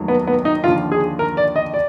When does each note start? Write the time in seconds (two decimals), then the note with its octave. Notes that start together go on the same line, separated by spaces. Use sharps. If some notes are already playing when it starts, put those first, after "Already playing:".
Already playing: F1 D#2 D#3 F#3
0.08 B3
0.27 B3
0.45 D#4
0.64 D#2 D3 F3 F4
0.92 G#4
1.19 A#4
1.37 D5
1.56 D#5
1.74 D5